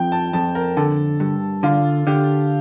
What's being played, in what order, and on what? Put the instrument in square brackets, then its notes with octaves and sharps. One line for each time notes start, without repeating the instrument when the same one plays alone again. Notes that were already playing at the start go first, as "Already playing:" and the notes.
Already playing: [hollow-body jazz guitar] F2 F3 [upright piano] G5
[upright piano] A5
[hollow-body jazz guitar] F2 [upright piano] A5
[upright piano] A#4
[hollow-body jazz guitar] D3 [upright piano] A4
[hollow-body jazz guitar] G2
[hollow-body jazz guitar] D3 [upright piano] F4
[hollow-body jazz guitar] D3 [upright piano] G4